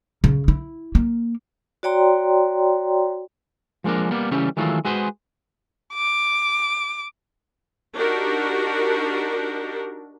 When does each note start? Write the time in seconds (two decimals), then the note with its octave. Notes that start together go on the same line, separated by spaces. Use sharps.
0.24 C#3
0.48 E4
0.95 A#3
1.83 F#4 C#5 D5 G5 A#5 C6
3.84 F3 G#3 A#3 D4 A#4
4.11 G3 A#3 B3
4.31 C#3 E3 G3 A3 C#4 G4
4.57 D#3 E3 F#3 G#3 A3 F4
4.85 G#3 F#4 G#4 B4 C5
5.94 D6
7.95 D4 D#4 F#4 G4 A#4